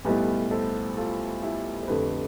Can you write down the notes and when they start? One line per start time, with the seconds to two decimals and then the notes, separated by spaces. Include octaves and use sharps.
0.05 B1 A2 G3 B3 G4 B4
0.51 A4 C5
0.97 F4 A4
1.43 E4 G4
1.83 C5
1.88 F2 D3 A3 G4 B4